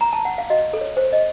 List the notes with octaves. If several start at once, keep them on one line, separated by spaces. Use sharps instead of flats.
A#5
A5
F#5
F5
F#4 D#5
A4
C#5
C5
D#5